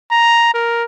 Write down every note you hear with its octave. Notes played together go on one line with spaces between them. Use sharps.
A#5
A#4